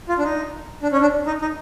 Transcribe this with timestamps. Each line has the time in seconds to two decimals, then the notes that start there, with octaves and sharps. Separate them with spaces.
0.09 F4
0.19 D4
0.24 D#4
0.83 D4
0.92 C#4
1.01 D4
1.27 D#4
1.41 D#4